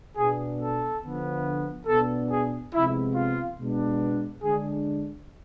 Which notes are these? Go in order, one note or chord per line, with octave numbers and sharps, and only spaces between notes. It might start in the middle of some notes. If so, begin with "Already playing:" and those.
B2 B3 D4 G#4
A4
D3 F3 B3
B2 B3 D4 A4
G#4
C3 F3 G#3 B3 E4
F4
B2 G#3 B3 D4
D3 G#3 D4 G#4